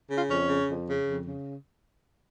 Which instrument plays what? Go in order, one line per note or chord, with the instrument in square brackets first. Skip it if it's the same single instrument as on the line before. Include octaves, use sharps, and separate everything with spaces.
[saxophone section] C#3
F4
F2 C#4
C#3
F2
C#3
F2
C#3